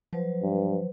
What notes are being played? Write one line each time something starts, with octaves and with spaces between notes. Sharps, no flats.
F3 F#3 B4 C5
G2